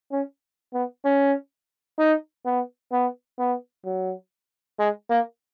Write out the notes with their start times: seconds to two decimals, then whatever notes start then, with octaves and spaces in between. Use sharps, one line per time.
0.12 C#4
0.74 B3
1.05 C#4
1.99 D#4
2.45 B3
2.92 B3
3.39 B3
3.85 F#3
4.79 G#3
5.10 A#3